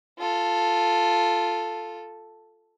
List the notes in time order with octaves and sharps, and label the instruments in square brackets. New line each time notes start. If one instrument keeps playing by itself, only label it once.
[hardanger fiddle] F4 A4